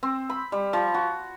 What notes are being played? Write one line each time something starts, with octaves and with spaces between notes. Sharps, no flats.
C4
B5
G3
F3
F#4